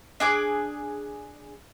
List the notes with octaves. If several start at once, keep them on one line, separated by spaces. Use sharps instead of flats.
D4 G#4 D6